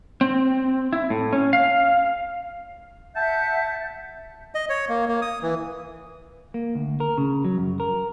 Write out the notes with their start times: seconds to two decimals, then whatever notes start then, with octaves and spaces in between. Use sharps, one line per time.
0.21 C4
0.93 E4
1.10 A2
1.33 C#4
1.53 F5
3.16 E5 F#5 A5 G6
4.55 D#5
4.69 C#5
4.89 A#3
5.08 A#3
5.22 D#6
5.42 E3
6.54 A#3
6.75 D2
7.00 A#4
7.18 C#3
7.45 F#3
7.58 F#2
7.80 A#4